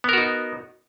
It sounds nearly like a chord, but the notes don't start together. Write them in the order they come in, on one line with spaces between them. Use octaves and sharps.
B3 A#4 F#4 D#4